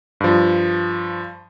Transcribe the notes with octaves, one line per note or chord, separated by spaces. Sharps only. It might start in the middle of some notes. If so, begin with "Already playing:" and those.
G2 F3